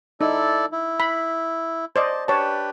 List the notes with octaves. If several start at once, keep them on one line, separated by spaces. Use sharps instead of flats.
D#4 E4 A4 D5
E4
B5
C5 D5 D#5 A5
D4 G4 B4 C#5 A5